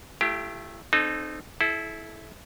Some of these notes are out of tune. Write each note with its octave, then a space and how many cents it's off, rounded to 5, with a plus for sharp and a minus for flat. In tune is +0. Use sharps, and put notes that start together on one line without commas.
A3 -15 E4 +45 G4 +0
C4 +0 D#4 -30 A4 -20
E4 -5 A4 -35